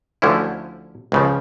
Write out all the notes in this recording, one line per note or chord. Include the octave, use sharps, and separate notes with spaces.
D2 D3 F3 C#4 E4
C#2 C#3 F3